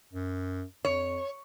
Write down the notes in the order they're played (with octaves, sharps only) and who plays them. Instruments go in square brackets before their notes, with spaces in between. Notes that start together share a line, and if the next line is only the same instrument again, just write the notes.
[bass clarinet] F#2
[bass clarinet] F2 [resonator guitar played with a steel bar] C#5